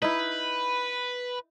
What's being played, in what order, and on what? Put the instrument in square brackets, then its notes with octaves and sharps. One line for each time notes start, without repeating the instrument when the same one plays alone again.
[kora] D#4 E4 [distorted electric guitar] B4